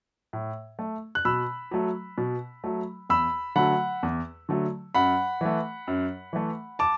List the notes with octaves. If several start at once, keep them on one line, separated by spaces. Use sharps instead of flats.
A2
A3
F#6
B2 B5 E6
F#3 A3
B2
F#3 A3
E2 B5 E6
D3 F#3 A3 F#5 B5
E2
D3 F#3 A3
F#2 F#5 B5
E3 A3
F#2
E3 A3
A5 D6